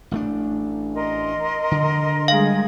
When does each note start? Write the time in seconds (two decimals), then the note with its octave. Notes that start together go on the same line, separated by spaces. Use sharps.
0.11 A1 A3 D4
0.94 A#4 D#5 C6
1.71 D3
2.28 G3 G#3 G#4 F5